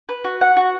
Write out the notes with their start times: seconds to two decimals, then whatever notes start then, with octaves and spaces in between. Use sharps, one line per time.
0.09 B4
0.24 F#4
0.41 F#5
0.57 F#4